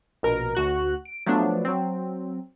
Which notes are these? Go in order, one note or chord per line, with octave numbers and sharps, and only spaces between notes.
A#1 B2 A#4
D2 F#4 F#6
D7
F3 F#3 A3 B3 D4
F#3 C4